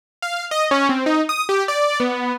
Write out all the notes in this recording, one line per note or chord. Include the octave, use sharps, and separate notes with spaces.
F5
D#5
C#4
C4
D#4
D#6
G4
D5
B3